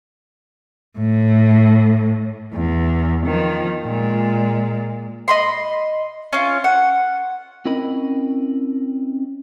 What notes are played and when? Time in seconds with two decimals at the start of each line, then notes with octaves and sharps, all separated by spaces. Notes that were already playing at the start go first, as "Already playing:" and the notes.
0.98 A2
2.53 E2
3.25 D#3 F3
3.85 A#2 G#3
5.28 D#5 B5 C6
6.33 C#4 F4
6.64 F#5
7.65 C4 C#4 E4 A#4 D#5 B5